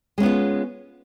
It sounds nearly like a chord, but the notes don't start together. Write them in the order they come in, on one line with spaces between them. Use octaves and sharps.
G#3 C#4 B3 F4